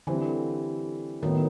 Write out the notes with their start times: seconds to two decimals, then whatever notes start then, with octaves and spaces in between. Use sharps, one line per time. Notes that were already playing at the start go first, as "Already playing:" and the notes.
0.07 D3 E3 G3 C4
1.22 A2 D#3 F#3 B3 D#4